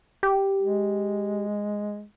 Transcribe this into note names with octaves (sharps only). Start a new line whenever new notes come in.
G4
G#3